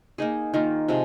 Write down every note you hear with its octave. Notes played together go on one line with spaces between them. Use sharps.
A#3 D#4 G#4
D#3 A#3 F4
C3 F3 G#3